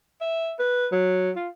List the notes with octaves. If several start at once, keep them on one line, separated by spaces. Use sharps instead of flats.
E5
B4
F#3
F4